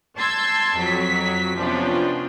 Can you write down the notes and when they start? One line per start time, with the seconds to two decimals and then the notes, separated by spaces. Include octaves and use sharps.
0.17 A5 C6 E6 G6 G#6
0.78 F2 F#3 B6
1.57 C3 F3 B3 C#4 D4 F4